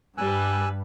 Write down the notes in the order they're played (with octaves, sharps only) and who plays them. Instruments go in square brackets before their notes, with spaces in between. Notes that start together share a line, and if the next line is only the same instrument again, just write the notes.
[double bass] G2 [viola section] G3 G4 B4 [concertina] G#5 E6 F#6